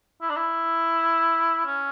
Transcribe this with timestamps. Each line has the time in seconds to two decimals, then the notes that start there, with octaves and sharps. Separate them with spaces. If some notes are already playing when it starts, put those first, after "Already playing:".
0.21 E4
0.29 D4
0.36 E4
1.66 C#4